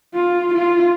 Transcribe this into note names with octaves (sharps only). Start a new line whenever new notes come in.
F4
F4